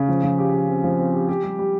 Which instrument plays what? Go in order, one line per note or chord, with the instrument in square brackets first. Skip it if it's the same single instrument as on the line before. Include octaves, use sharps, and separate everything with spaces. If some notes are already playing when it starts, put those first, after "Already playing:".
Already playing: [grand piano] C#3
F3
F3
G4
G4
C4
F3
C4
G4
G4
G3
G3